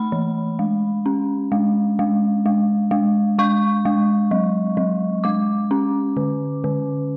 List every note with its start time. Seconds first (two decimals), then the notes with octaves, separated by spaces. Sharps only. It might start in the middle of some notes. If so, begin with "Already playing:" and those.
Already playing: A3 B5
0.12 E3
0.59 G#3
1.06 C#4
1.52 G#3
1.99 G#3
2.46 G#3
2.91 G#3
3.39 G#3 C#6
3.85 G#3
4.31 F#3
4.77 F#3
5.24 G#3 D6
5.71 C#4
6.17 D3
6.64 D3